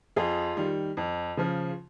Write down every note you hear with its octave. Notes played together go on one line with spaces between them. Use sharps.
F2 F4 G#4
D#3 G3
F2
C#3 F3